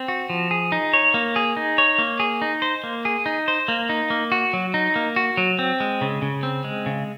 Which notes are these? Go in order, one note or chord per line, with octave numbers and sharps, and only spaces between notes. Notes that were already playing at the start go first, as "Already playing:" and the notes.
Already playing: C4
F#4
F3
G#4
D#4
C#5
A#3
G#4
D#4
C#5
A#3
G#4
D#4
C5
A#3
G#4
D#4
C5
A#3
D#4
A#3
F#4
F#3
D#4
A#3
F#4
F#3
C4
G#3
C#3
C#3
C4
G#3
C#3